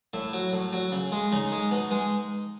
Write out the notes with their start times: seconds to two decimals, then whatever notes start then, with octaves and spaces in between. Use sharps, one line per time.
0.13 A2 E4
0.33 F#3
0.53 A2
0.73 F#3
0.92 C#3
1.12 G#3
1.32 C#3 D#4
1.52 G#3
1.71 B2
1.91 G#3